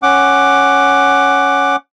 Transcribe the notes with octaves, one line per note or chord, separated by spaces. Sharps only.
C#4 F#5 D6